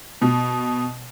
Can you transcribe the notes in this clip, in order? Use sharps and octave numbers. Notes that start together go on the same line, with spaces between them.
B2